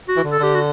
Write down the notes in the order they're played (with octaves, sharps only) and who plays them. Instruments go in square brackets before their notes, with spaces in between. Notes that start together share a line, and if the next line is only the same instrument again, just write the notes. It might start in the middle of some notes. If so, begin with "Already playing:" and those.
[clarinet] F#4
[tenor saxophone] E3
D3
[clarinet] A4
[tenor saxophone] D3 [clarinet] G4
[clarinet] F#4